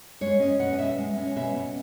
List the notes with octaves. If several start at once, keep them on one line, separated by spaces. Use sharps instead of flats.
G#3 C#5
C#4 D#5
B2 F#5
D#5
B2 E5
G#3
C#4
B2 E5
B2